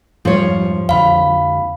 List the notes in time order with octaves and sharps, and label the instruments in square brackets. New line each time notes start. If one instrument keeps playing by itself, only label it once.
[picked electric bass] F2 G#2 G3 [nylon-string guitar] F3 C#5
[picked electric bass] F2 D3 [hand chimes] F5 B5